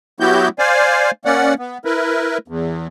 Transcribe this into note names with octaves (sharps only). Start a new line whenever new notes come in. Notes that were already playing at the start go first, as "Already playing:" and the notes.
F#3 B3 E4 F#4 G4 G6
C5 D5 F5 G#5
A#3 C#4 D5 F#5
B3
E4 A#4 B4
E2